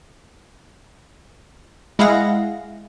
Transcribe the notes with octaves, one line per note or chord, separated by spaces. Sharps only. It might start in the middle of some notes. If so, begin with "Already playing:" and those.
G#3 E4 G#4 F5 F#5 A#6